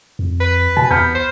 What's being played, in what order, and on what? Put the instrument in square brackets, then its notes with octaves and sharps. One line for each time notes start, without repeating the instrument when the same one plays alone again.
[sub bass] F2
[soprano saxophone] B4
[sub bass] B2 [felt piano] G#5 A5
[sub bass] E2 [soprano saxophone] B3 [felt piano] B5 F6 G6
[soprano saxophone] C5